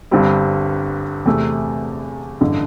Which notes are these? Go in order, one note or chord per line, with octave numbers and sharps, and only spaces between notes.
G1 G2 G3 C4
E2 C3 A3
A1 G2 D3